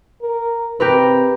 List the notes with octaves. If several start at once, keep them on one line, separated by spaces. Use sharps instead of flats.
A#4
C3 G4 A#4 B4